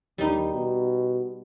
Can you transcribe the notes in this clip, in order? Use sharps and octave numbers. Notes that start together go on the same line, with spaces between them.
D#2 G3 D#4
B2